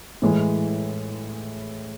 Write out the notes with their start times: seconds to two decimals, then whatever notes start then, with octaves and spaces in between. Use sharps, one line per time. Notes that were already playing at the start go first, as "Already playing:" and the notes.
0.22 A2 E3 G#3